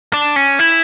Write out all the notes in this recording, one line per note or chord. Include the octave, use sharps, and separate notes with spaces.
D4
C#4
E4